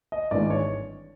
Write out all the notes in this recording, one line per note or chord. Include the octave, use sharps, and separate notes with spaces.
D#5
G#1 G2 E3 G#3 D5
C#5